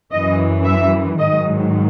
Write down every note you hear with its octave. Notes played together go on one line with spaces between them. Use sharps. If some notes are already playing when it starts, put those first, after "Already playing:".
F#2 E3 D#5
E5
G#2 D#3 F#3 D#5